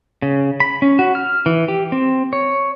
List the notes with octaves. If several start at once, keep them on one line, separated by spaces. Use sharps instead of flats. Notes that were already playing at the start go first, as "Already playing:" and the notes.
C#3
B5
C#4
F#4
F6
E3
G4
C4
C#5